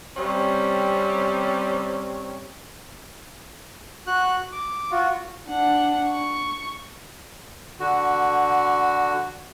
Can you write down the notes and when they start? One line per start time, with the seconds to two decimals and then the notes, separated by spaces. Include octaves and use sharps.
0.16 C3 G3 C4 C#4
4.07 F#4 F#6
4.52 D6
4.91 F4 F#4
5.48 D4 F#5
6.09 C#6
7.80 D3 F#4